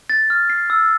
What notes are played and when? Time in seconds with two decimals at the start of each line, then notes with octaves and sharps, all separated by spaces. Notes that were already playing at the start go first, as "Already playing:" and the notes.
0.10 A6
0.30 F6
0.50 C7
0.70 E6